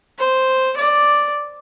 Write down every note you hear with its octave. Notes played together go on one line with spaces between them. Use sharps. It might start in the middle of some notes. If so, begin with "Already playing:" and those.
C5
D5